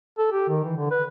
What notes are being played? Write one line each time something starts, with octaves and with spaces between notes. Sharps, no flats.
A4
G4
D#3
E3
D3
B4